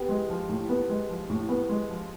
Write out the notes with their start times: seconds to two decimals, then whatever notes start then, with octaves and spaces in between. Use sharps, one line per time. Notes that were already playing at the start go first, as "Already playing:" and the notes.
Already playing: B3 G4 G5
0.09 G#3
0.29 F3
0.49 A2
0.69 B3
0.89 G#3
1.09 F3
1.29 A2
1.49 B3
1.69 G#3
1.89 F3